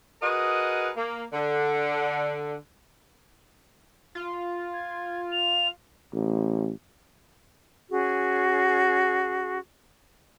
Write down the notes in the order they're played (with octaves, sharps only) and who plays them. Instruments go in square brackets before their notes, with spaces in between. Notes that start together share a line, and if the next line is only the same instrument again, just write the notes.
[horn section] F#4 G#4 A#4 B4 D#5
A#3
D3
[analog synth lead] F4
[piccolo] G#6
F7
[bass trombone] A1
[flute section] C#4 F#4 G#4